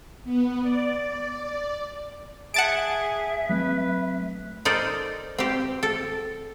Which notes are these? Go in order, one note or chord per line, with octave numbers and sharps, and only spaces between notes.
B3
D5
G#4 E5 F#5 A5 D7
F#3 A3 C4 B4
D#4 A4 A#4 C5 D5
C4 G4
A4